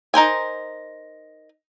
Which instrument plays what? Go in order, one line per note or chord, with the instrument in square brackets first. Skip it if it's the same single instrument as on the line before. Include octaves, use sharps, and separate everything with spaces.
[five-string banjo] D#4 A#4 C5 G#5